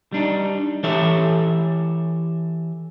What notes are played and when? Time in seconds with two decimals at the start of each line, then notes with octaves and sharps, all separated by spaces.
0.12 G3 D4 D#4
0.83 E3 G4 A4 C#5 E5